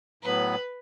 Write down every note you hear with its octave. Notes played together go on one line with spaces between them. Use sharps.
A2 F#3 B3 B4